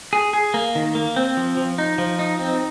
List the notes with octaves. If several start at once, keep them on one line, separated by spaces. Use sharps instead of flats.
G#4
G#4
A#3
D#3
A#3
C4
F3
F3
D#4
F3
D#4
C4